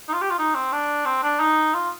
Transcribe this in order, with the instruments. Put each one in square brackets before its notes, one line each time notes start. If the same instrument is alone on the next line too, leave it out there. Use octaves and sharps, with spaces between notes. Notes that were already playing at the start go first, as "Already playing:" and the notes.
[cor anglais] D#4
F4
G4
F4
D#4
C4
D4
C4
D4
D#4
F4